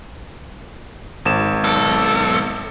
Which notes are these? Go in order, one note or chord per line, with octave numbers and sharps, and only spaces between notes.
G#1 E7
B1 A4